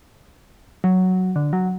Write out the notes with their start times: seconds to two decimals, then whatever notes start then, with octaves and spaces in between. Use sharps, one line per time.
0.84 F#3
1.36 D3
1.53 F#3